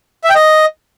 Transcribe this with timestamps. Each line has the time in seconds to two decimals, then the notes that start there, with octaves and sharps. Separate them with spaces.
0.24 E5
0.30 G5
0.35 D#5